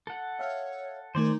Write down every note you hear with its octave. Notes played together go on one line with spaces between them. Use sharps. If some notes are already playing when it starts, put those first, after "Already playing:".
A4 F#5
C#5 E5 F5
D#3 A3 D#4 A#4 C5 D5 G#5